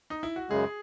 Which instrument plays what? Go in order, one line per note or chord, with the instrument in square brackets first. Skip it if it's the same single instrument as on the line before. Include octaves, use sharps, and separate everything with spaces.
[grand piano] D#4
E4
F#4
[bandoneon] F#2 C#3 G#3 [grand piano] G#4